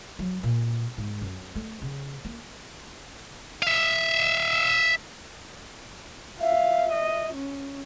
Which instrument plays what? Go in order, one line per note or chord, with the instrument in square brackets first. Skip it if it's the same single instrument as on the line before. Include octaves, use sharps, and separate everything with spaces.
[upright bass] F#3
A#2
G#2
F#2
A3
C#3
A#3
[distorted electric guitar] E5 F5
[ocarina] E5 [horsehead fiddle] F5
[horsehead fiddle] D#5
C#4